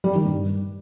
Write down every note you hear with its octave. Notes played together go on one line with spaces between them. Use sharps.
G3
D#3
G2